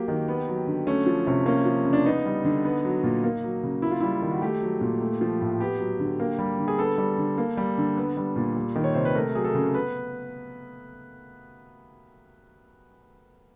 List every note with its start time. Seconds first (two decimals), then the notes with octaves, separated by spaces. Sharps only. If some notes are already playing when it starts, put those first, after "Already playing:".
Already playing: F#3 A#3 G4
0.08 D#3
0.28 B3
0.48 F#3
0.67 D3
0.87 A3 C#4
1.06 F3
1.27 C3 C#4
1.46 A#3 C#4
1.65 F3
1.85 C#3
1.93 D4
2.05 B3 D#4
2.25 G3
2.44 D3
2.65 B3
2.85 F#3
3.03 A#2
3.24 A#3
3.44 F#3
3.63 C#3
3.82 A#3 E4
3.91 F4
4.00 G3 E4
4.22 D#3
4.31 F#4
4.42 A3 G4
4.61 F#3
4.81 A#2
5.01 A3
5.21 F3
5.41 A2
5.60 B3 G4
5.80 F#3
6.00 D3
6.20 A#3
6.39 G3
6.58 D3
6.68 G#4
6.78 B3 A4
6.98 G3
7.18 D3
7.38 A#3
7.57 G3
7.78 D3
7.97 B3
8.17 G3
8.36 A#2
8.57 G3
8.76 D#3
8.84 C#5
8.94 C3 C5
9.05 B4
9.15 A3 A#4
9.35 F#3 G#4
9.44 A4
9.55 C#3
9.74 B3 B4